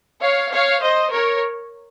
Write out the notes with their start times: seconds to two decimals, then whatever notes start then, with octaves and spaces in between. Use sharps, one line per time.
0.21 C#5 F5
0.51 C#5 F5
0.81 C5 D#5
1.11 A#4 C#5